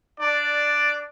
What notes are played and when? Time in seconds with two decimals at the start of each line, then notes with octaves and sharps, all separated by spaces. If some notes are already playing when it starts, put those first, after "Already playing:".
0.19 D4 D5